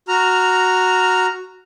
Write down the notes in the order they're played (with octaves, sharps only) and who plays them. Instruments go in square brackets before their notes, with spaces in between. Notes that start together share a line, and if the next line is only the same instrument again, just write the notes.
[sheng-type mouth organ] F#4 A#5 F6